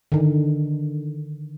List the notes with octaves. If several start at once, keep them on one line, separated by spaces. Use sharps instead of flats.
D3 D#3